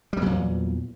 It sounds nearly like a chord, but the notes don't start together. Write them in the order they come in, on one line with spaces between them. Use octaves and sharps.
G3 F#3 A#2 E2